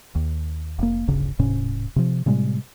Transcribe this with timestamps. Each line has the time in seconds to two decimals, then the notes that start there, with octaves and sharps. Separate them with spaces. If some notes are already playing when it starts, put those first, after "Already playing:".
0.15 D#2
0.79 F1 A#3
1.08 D1 G1 C#3
1.39 D1 G#2 C3 C#4
1.96 C3 F3
2.26 A2 C3 G3 G#3